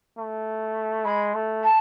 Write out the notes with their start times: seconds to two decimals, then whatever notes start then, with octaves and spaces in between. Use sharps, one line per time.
0.18 A3
1.05 G#3 B5
1.34 A3
1.64 A5